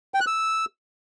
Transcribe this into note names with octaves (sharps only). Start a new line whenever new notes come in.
G5
F#6
E6